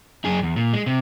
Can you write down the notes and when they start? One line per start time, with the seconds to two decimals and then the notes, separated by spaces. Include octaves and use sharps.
0.25 F#2 G#4
0.43 E2
0.56 A#2
0.73 G#3
0.86 C3